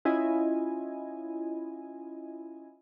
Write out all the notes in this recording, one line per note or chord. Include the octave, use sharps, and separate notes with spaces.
C#4 E4 F4 D#5 G#5